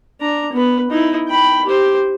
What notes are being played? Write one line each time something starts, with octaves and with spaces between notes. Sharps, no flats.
D4 A#5
B3 B4
D#4 E4
G5 B5
G4 C5